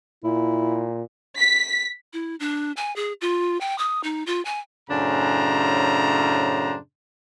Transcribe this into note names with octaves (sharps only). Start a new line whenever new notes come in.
A#2 E4
B6
E4
D4
G#5
G#4
F4
G5
D#6
D#4
F4
G#5
F#2 A2 C#3 D4 C5 A#5